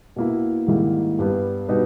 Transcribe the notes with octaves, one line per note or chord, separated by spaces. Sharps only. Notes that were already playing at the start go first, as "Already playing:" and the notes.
B2 A#3 E4
G#2 D#3 G3 A#3 E4
G2 G3 B3
B2 G3 B3 D#4